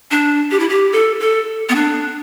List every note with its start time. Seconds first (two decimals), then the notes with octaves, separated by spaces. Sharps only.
0.11 D4
0.51 G4
0.60 E4
0.69 G4
0.92 A4
1.20 A4
1.69 B3
1.75 D4